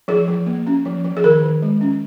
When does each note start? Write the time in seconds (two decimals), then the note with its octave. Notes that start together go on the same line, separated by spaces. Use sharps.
0.08 F3 G#4
0.28 F3
0.46 A#3
0.67 C#4
0.85 F3
1.04 F3
1.17 G#4
1.24 D#3 A#4
1.42 D#3
1.62 G#3
1.81 C#4